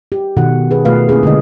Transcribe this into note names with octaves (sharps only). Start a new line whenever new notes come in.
G4
B2 D#3 F#4 A4 F#5
G#4 B4
B2 A3 F4 B4 F5
A#3 C#4 E4 G#4
D3 G#3 D#5